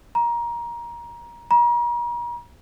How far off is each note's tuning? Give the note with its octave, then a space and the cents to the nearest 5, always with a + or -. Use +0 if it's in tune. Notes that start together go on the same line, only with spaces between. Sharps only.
A#5 +20
A#5 +40